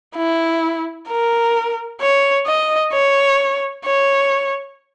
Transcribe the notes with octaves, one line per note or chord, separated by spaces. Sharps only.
E4
A#4
C#5
D#5
C#5
C#5